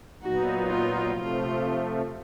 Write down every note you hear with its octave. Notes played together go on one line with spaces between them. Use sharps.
A#2 F#3 B3 D#4 F#4
F4
C3 F3 A3 F4